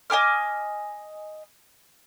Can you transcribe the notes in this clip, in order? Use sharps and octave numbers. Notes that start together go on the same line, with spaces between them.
D#5 G#5 D6 F6